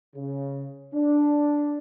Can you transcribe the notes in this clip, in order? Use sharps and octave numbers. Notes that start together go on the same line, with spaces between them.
C#3
D4